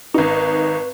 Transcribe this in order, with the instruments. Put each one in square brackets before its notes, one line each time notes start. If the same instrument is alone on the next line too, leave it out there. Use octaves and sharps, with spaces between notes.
[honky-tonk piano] G#1 D#4 [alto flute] B4